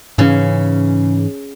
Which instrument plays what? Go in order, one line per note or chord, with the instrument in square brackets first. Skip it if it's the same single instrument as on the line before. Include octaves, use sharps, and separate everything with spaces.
[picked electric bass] G#2 E3 C#4 [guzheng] C#3